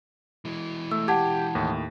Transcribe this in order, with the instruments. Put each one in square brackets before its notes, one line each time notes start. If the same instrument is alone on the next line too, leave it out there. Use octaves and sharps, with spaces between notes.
[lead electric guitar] E3 G#3
[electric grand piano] A3 [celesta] E6
[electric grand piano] G4 G5 [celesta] F#5 A5 G#6
[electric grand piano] D#2 A2